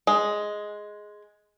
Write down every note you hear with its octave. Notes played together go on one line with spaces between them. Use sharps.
G#3